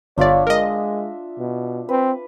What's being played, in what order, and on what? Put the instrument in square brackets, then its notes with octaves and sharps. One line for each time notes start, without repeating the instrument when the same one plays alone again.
[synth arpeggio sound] G1 D5 [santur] D4 F4 E5 [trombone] C#5
[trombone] G#3 [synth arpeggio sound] A#4 D#5
[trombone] B2
[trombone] C4 [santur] B4